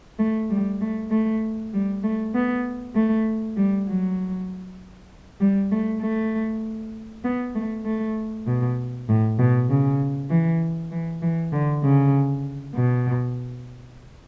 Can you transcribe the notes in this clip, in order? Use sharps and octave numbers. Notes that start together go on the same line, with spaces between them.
A3
G3
A3
A3
G3
A3
B3
A3
G3
F#3
G3
A3
A3
B3
A3
A3
B2
A2
B2
C#3
E3
E3
E3
D3
C#3
B2